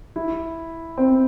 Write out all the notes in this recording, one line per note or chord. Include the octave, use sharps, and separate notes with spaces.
E4
C4